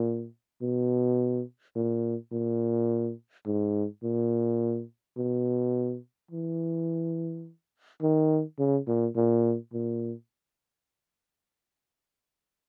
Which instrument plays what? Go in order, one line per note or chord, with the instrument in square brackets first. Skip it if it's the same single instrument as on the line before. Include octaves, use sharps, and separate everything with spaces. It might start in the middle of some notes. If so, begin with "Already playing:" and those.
Already playing: [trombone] A#2
B2
A#2
A#2
G#2
A#2
B2
E3
D#3
C#3
A#2
A#2
A#2